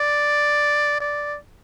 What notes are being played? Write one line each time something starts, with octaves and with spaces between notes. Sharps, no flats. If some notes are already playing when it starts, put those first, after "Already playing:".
Already playing: D5
D5